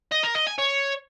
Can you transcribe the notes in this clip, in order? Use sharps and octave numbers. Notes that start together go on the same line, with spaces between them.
D#5
A#4
D#5
G#5
C#5